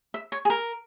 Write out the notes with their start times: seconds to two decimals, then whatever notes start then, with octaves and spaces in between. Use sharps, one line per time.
0.14 E5
0.32 C#5
0.45 G#4
0.50 A#4